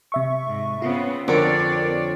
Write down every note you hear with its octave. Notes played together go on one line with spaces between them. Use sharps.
C3 E5 C#6
G#2
C#3 B3 C4 F4
F2 D3 C4 D4 A#4 C#5 D5 D6